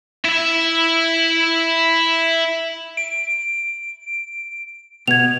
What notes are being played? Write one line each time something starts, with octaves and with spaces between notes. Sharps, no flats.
E4 E5
D7
B2 B3 G#6 F7